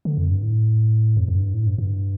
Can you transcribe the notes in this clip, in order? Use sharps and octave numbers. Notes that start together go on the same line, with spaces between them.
D3
F2
G2
A2
F2
F2
G2
A2
G2
G2